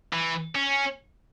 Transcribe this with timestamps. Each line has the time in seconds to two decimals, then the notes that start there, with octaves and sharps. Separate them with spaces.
0.13 E3
0.55 C#4